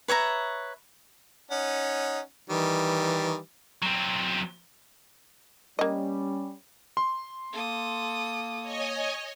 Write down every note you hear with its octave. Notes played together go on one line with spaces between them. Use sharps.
B4 C#5 E5 A#5
C#4 D#4 F#5
D#3 E3 G3
F#3 C4
G3 A#3 C#4 D#5
C6
A#3 A4 D#6
C#5 D#5 G#5